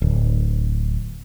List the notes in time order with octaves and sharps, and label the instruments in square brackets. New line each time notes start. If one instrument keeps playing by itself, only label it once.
[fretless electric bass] D1